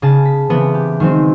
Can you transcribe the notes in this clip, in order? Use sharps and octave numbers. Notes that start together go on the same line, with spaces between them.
C#3 G#4 A5
B6
C#3 E3 B3 C4
G4
D#3 F#3 G#3 C4